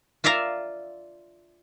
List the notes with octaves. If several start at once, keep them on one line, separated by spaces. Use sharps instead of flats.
F4 D5 E5 F5 A#5